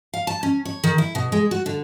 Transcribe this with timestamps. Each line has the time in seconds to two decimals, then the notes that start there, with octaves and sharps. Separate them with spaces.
0.14 F5
0.27 A5
0.43 C#4
0.65 C#5
0.84 D#3
0.98 E4
1.15 B2
1.32 G#3
1.51 F#4
1.66 D3